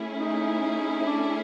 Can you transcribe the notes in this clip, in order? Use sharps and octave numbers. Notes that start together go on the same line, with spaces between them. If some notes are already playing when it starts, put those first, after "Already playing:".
Already playing: A3 C#4 E4 G#4
D#4
D4